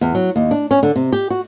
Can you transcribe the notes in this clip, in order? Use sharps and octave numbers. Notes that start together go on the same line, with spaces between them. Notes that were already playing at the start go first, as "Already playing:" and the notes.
E2
F#3
D#2
D4
C#4
D3
C3
G4
F#4